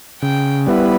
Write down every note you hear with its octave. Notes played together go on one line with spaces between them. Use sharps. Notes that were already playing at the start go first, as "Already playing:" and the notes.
C#3 G5
G3 B3 E4 B4